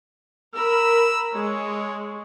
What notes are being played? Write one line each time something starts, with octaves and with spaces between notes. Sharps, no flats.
A#4 B5 E6
G#3 C#5